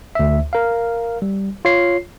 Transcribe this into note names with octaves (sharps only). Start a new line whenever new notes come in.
D2 E5
A#4 F5
G3
F4 C#5 C7